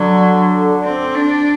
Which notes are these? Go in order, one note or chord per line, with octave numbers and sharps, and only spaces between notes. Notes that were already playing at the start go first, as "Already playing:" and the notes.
Already playing: D3 F#3
C4
D4